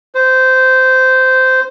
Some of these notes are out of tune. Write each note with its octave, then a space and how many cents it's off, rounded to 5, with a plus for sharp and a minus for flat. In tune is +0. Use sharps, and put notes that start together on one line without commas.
C5 -15